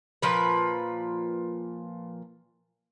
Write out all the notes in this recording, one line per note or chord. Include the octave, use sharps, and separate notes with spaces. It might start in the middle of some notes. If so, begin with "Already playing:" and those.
A#2 F3 B4